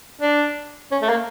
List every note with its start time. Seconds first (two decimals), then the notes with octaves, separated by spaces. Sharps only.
0.21 D4
0.91 C#4
1.02 A3
1.09 A#3